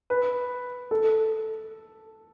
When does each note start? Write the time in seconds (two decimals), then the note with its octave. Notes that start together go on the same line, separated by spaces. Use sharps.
0.10 B4
0.91 A4